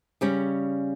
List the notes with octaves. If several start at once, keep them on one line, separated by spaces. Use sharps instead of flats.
C#3 G3 C#4